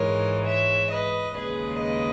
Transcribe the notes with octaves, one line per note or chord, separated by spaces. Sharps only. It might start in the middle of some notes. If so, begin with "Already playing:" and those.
Already playing: G#2 E3 G#3 A#4 C#5
C#5 E5
B4 D#5
D#2 C#3 G#3 G#4 B4
B4 D#5